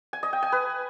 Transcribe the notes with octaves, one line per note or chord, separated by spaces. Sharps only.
G#5
D#5
G5
G#5
B4